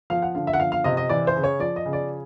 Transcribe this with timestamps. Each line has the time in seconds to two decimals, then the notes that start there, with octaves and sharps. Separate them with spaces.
0.10 F3 F5
0.22 F#5
0.35 D3 F5
0.47 E5
0.53 F#5
0.60 F3 F5
0.72 F5
0.84 C3 D#5
0.97 D#5
1.09 E3 D5
1.27 C5
1.36 C#3
1.44 C#5
1.60 F3 D5
1.76 D#5
1.85 C#3
1.93 D5